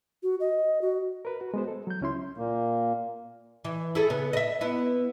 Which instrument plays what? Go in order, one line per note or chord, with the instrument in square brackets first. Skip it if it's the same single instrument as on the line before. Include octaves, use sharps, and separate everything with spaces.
[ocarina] F#4
D#5
F#4
[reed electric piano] A#4 B4
F#4
G#3 B3 C5
A4
F#3 G6
C#2 C#4 E4 C6
[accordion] A#2 A#3
[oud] E3
E4 G#4 A4
C#3 B3
D#5 E5
B3 E4